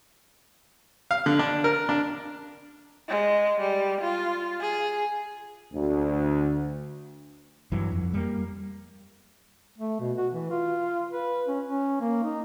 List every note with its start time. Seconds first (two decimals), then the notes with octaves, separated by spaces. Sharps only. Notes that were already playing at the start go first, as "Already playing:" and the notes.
1.11 F5
1.26 D3
1.39 D4
1.64 A#4
1.89 D4
3.09 G#3
3.60 G3
4.01 F4
4.61 G#4
5.73 D2
7.72 G2 E3 F#3
7.92 F2
8.14 G3 A#3
9.78 A3
10.00 B2
10.17 F#4
10.32 E3
10.50 F4
11.11 B4
11.48 C#4
11.64 C#4
12.01 A#3
12.23 D#4